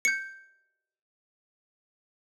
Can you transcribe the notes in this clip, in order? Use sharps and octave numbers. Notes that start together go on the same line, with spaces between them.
G6 C#7